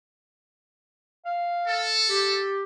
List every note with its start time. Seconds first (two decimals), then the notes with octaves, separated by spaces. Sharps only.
1.25 F5
1.67 A4
2.09 G4